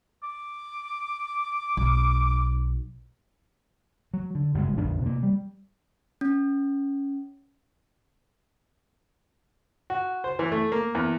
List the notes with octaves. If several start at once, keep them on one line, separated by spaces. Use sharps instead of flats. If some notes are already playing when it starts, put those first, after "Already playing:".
D6
B1
F#3
D3
F#1 G2 C#3 G#3
A#1 F2 D3 D4
C3 A#3
G3
C#4
F#4
C5
E3
A3
A#3
E2